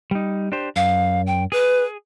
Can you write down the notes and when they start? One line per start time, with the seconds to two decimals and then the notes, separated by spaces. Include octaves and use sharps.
0.11 G3 D#4
0.52 D4 G4 C5
0.76 F#2 F5
1.27 G5
1.52 G#4 B4